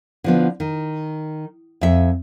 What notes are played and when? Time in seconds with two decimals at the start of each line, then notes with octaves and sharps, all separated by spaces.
0.24 D3 F3 B3
0.60 D#3
1.81 F2 E5